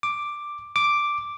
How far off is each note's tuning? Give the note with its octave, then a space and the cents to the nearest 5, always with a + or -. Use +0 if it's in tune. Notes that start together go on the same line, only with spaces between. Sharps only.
D6 +5
D6 +0